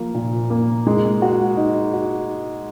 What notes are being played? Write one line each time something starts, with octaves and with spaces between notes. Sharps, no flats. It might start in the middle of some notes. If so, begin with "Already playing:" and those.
Already playing: F3 A#3
A#2
A#3
G#3
F#4
D#4
F#4